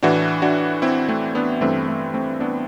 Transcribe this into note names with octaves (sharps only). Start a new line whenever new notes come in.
A2 E3 D4 F#4
D4 F#4
C4 E4
A3 C4
B3 D4
G2 E3 A3 C4
A3
A3 C4
B3 D4